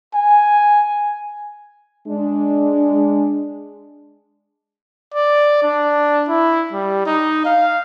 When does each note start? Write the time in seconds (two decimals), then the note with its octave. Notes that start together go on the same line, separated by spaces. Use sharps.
0.15 G#5
2.07 G#3 D4
5.14 D5
5.63 D4
6.29 E4
6.73 G3
7.07 D#4
7.45 F5